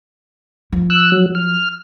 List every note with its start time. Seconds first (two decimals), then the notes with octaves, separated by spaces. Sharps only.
0.72 F3
0.90 E6 F#6
1.12 F#3
1.35 F6